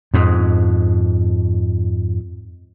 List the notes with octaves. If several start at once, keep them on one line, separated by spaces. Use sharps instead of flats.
F2 G#2